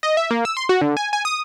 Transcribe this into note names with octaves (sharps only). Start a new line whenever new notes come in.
D#5
E5
A#3
E6
C6
F#4
D3
G#5
G#5
D#6